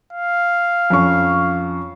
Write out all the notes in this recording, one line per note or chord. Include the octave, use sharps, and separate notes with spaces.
F5
F2 C#4 C#6